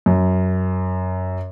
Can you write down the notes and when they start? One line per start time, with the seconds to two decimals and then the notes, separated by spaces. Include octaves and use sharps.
0.06 F#2